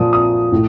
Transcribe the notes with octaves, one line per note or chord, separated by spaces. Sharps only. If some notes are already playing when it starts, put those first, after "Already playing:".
Already playing: A#2 F3 D#6
D#6
A2